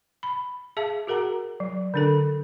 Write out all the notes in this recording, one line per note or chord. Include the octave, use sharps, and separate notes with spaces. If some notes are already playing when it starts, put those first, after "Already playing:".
B5
G#4 E5 F5 A5
F#4 G#4 A#4 F#5 A#5
F#3
D3 D4 A4